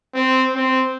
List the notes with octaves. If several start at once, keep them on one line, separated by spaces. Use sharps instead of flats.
C4
C4